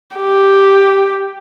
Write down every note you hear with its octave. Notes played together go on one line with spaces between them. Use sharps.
G4